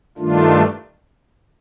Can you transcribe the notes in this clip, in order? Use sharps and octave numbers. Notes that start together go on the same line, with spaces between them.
G2 D#3 A3 D4 F4